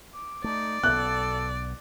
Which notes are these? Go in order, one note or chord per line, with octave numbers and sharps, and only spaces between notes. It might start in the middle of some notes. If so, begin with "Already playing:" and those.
D6
A3 D#4 D5
B1 B3 A4 F#6